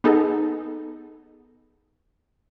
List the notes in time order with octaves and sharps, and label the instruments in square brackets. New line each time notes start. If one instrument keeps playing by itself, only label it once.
[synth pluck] B3 D#4 G#4 A4